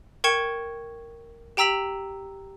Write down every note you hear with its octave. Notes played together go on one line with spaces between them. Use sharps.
A#4 G5 C#6 G#6 C#7 E7
G4 G5 A#5 E6 B6 F#7